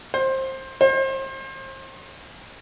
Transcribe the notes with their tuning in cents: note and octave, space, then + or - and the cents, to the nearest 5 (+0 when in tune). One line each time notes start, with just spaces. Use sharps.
C5 +20
C5 +35